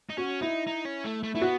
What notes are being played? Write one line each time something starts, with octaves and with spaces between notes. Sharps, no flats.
D#4
C#4 F#4
D#4 E4
D#4
C#4
A3
A3
A3 E4
B3 F#4